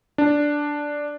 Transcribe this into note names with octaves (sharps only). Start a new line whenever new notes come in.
D4